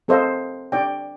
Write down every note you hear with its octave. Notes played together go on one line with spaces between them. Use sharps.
C4 A4 A#4 C5 D#5 F5
D4 D5 G5